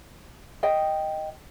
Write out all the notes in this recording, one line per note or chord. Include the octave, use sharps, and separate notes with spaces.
D#5 G5